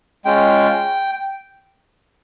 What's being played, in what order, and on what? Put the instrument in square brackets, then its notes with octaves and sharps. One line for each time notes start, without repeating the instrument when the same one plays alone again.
[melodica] G#3 C#4 F4 G5